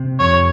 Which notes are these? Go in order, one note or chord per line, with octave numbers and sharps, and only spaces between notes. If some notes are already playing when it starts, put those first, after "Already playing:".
Already playing: C3
F2 C#5